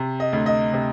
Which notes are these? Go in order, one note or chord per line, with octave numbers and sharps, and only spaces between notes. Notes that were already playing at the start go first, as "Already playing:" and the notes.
Already playing: C3
D#5
D2
D#5
C3